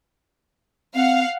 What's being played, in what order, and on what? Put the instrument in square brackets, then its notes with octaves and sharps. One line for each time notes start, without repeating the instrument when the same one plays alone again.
[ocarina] C4 [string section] F5 F#5